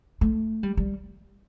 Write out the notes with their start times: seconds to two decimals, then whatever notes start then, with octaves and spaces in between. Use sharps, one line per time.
0.21 A3
0.63 G3
0.77 G3